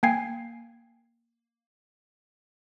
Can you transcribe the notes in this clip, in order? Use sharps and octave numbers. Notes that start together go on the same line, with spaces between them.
A#3 G5 G#5 G#6 C7